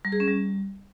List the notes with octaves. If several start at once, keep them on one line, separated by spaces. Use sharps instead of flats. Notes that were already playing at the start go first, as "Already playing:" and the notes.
G3
G#4
C#4
G3